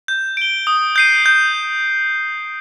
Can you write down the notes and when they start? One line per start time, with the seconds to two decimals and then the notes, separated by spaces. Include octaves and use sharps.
0.08 G6
0.37 D7 G7
0.67 D#6
0.96 G6 C7 D#7
1.26 G6